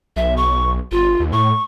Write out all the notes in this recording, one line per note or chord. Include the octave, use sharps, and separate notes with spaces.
B1 E5
C#6
G1 F4
D#2
A2 C#6